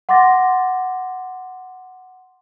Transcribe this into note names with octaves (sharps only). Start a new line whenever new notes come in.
F#5 C6 D6 A6 A#6